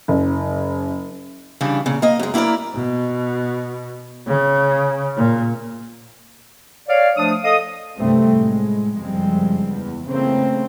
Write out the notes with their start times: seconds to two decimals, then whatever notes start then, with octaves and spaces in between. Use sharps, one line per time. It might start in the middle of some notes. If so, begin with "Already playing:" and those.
0.08 F#1
1.61 C#3 E3 G3 D4
1.86 A#2 C#3
2.02 A#3 D#5
2.19 F#2 G#3
2.34 A#3 E4 F4 A#4 D5
2.74 B2
4.27 C#3
5.16 A#2
6.89 C#5 D5 F5
7.17 F3 A3 D4 D#6
7.43 A4 D#5 F5 D#6
7.98 C2 G2 C3 G3 A3 C4
8.35 A2 G#3
8.97 F#1 F2 F3 G3 G#3 C4
9.69 E2
10.08 C#3 E3 A3 A#3 C4